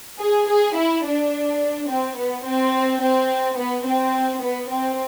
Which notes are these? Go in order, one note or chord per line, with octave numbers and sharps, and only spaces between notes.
G#4
G#4
E4
D4
C4
B3
C4
C4
B3
C4
B3
C4